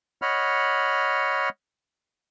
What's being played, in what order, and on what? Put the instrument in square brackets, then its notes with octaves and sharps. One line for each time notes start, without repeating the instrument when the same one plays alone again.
[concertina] C#5 D#5 F#5 B5 F6